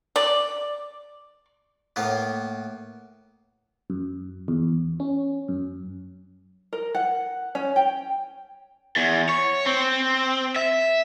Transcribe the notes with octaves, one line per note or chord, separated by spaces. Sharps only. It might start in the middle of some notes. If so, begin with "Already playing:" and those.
D5
A2 A#3 B3
F#2
E2
C#4
F#2
A#4
F#5
C#4
G5
E2
C#5
C4
E5